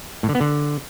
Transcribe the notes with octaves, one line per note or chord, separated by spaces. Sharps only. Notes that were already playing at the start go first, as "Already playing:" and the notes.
A2
D3
B3
D3